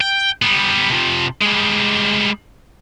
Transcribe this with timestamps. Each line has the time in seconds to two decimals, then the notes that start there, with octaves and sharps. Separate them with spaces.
0.01 G5
0.42 G3 B3
0.90 C3 F3
1.42 G3 G#3